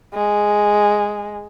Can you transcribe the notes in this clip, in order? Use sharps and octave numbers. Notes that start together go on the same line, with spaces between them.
G#3